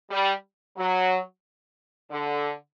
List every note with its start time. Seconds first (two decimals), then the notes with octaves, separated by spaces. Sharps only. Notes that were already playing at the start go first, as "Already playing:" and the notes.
0.11 G3
0.77 F#3
2.10 D3